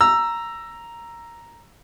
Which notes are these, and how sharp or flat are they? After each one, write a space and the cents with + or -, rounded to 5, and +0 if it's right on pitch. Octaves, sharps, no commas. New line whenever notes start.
A#5 +0 E6 +15